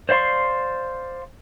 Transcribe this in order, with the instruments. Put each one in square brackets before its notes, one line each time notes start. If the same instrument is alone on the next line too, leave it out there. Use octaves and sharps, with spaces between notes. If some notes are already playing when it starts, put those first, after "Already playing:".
[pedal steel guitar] C5 D5 F5 C6 C#6